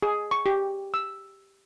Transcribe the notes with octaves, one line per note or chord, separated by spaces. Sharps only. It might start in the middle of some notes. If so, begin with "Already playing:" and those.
G#4
C#6
G4
E6